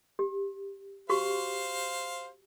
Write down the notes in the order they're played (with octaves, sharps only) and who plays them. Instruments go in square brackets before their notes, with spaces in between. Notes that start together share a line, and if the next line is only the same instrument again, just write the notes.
[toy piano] G4
[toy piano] F#4 G4 C#6 [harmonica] C5 F5